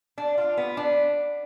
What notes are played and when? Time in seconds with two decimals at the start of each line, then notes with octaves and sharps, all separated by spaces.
0.18 D4
0.38 F4
0.57 B3
0.77 D4